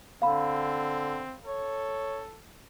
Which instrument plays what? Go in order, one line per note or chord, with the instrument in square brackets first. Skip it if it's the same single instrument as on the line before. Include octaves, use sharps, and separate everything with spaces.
[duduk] D3 [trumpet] C4 [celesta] F5 B5
[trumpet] A4 [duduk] C#5